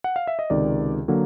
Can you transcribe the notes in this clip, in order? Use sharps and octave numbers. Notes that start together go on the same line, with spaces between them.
F#5
F5
E5
D#5
C#2 C3 D#3 D5
D3 F#3 A#3